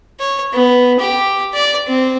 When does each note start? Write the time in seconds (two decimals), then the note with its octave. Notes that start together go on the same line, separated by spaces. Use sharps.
0.20 C#5
0.53 B3
1.00 G4
1.55 D5
1.88 C4